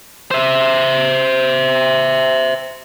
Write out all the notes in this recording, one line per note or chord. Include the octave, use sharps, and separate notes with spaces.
C5 E5